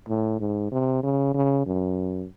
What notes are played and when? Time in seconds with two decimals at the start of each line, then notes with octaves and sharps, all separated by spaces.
0.09 A2
0.40 G#2
0.72 C3
1.03 C#3
1.34 C#3
1.66 F#2